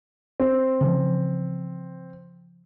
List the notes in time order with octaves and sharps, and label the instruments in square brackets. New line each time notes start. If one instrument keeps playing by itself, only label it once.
[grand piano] C4
[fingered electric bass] C#3 E3 F3